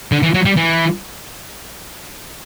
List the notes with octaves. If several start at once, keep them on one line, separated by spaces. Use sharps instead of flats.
D3
E3
F#3
G3
E3